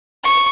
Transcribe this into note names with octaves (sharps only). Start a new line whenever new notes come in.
C#6